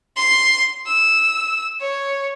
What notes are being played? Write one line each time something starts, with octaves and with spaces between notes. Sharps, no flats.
C6
E6
C#5